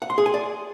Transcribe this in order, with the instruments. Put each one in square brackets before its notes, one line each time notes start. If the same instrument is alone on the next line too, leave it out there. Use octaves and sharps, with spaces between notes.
[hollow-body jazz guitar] F#5
C6
G#4
G#5
D5